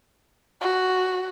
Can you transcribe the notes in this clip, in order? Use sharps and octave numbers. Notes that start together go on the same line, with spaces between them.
F#4